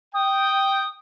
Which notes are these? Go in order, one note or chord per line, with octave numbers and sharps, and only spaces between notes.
G5 D#6